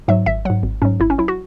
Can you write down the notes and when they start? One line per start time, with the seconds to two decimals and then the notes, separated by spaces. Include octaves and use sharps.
0.08 G#2 F#3 E5
0.26 G#1 E5
0.45 F#3 F#5
0.50 G#2
0.63 G#1
0.82 G#2 F#3 C#4
1.00 G#1 E4
1.10 C#4
1.18 F#3 E4
1.28 F#4